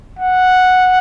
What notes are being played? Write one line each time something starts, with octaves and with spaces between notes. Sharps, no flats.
F#5